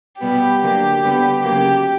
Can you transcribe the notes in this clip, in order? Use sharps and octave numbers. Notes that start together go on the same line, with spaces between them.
B2 G3 B3 G4
D3 F#3 A#3
D3 G3 B3
C#3 F#3 A#3 G4